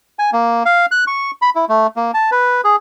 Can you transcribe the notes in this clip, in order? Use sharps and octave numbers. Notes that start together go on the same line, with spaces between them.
G#5
A#3
F5
F#6
C#6
B5
E4
A3
A#3
A5
B4
G#4